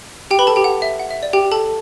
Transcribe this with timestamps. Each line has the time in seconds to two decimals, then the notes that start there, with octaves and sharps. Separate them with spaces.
0.31 G4 G5
0.39 B4 B5
0.47 A4 A5
0.56 G4 G5
0.64 F#5
0.82 E5
1.00 F#5
1.11 E5
1.23 D5
1.33 G4 G5
1.52 A4 A5